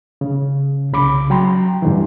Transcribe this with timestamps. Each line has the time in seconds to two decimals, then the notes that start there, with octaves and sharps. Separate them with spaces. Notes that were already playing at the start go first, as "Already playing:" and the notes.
0.21 C#3
0.92 C2 C#3 B5 D6
1.30 F#3 G5 A#5 C6
1.82 G2 D3 E3